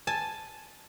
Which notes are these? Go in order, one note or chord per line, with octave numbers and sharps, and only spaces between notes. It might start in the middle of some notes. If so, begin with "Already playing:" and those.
G#5 A5